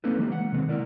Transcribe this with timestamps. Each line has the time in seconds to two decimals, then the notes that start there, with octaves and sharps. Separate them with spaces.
0.04 A#3 C4 C#4 D#4 A4 B4
0.19 E3 G3 G#3 A#3
0.32 F#5
0.52 C3 D#3 G#3 B3 C4
0.69 E4 A#4 D5